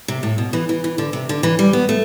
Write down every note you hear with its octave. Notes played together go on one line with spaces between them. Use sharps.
C3
A2
B2
E3
E3
E3
D3
C3
D3
E3
G3
B3
A3